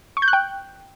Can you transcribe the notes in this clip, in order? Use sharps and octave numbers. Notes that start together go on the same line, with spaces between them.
C#6
G6
F#6
G5